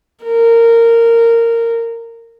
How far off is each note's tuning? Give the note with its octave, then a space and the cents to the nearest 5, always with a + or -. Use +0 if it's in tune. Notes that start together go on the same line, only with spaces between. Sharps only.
A#4 -15